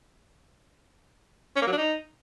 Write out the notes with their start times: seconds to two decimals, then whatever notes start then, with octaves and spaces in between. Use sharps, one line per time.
1.56 C#4
1.62 A#3
1.67 F#3
1.73 D4
1.78 D#4